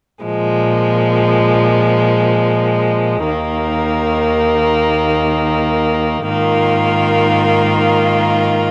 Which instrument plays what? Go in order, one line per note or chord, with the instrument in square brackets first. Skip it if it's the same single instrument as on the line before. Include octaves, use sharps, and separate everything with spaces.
[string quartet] A#2 F3 G#3
D#2 D#3 A#3
G#2 D#3 A#3 F4